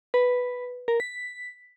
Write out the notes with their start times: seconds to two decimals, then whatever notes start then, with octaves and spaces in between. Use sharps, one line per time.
0.14 B4
0.88 A#4
1.00 B6